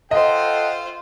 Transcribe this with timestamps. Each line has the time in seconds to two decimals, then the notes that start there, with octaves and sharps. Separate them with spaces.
0.11 F4 A4 C5 D#5 F#5 G5